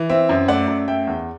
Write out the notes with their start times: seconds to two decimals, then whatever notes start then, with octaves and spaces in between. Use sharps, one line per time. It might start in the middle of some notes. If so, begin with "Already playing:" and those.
Already playing: E3
0.10 C4 E5
0.29 F#2
0.48 A3 D5 F#5
0.68 F#2
0.88 A3 E5 G5
1.07 E2